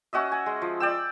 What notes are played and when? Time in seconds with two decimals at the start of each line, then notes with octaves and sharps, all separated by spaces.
0.13 C#4 F#4 D#5 E5
0.32 G#5
0.46 G#3
0.62 F3
0.80 D5 G5 E6